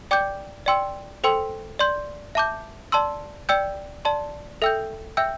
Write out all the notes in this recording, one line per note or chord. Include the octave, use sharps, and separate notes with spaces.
D5 G5 D6 G6
D5 G5 C6 E6
A4 C5 G5 C6 E6
D5 C6 G6
E5 A5 D6 G6
D5 A5 C6 E6
D5 G5 E6 G6
D5 A5 C6
A4 E5 G5 E6 G6
E5 G5 E6 G6